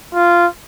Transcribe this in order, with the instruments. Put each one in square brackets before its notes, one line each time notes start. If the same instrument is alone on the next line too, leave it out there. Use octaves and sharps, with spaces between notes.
[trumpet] F4